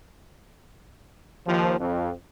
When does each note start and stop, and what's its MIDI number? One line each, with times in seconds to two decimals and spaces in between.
1.46 1.76 39
1.46 1.76 53
1.79 2.10 41